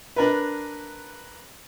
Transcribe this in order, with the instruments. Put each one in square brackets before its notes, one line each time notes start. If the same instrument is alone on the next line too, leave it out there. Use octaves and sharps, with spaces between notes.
[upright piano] D4 A#4 B4